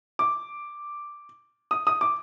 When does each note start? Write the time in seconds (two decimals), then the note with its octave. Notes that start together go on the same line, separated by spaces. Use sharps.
0.19 D6
1.71 D#6
1.87 D#6
2.01 D6